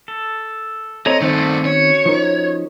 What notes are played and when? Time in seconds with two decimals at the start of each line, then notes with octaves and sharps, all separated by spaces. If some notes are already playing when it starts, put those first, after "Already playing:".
0.08 A4
1.06 C4 A4 C#5 D#5 A#5
1.21 G2 D#3 A3 C4 C5 F#5 A5
1.65 C#4 F#4 C#5
2.06 F3 D#4 A#4